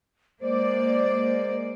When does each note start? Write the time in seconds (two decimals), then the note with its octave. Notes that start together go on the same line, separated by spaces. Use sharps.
0.41 G#3 A#3 C5 D5